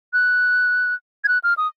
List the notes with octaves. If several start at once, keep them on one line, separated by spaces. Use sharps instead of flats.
F#6
G#6
F#6
F6
D#6